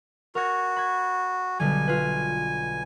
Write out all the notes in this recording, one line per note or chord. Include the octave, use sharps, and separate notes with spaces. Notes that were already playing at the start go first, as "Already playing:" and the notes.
F#4 A#4 C#5
B5 G#6
B1 D3 G3 G#5
F4 B4